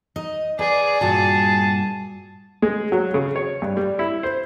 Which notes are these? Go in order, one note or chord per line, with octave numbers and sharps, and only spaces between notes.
D#4 D#5
G#4 B4 D5
G2 A#2 F#4 A5
G#3
F#3
C#3
C#5
G2
G3
E4
C5